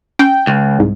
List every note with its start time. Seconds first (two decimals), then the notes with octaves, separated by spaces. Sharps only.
0.19 C#4 G5
0.47 C#2
0.79 C2 G#2